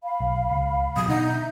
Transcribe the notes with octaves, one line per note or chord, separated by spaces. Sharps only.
F5 B5
B1
C#2
B2 F#3 D#6
B2 D3 D#4 D#5 F#5
E5 G6